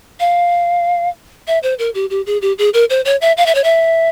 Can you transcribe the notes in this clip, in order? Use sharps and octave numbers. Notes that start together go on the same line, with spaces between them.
F5
E5
C5
A#4
G4
G4
G#4
G4
G#4
A#4
C5
C#5
E5
F5
E5
C#5
E5